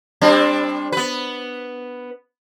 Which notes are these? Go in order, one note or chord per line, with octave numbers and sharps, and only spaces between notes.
G3 C4 D4
B3 B4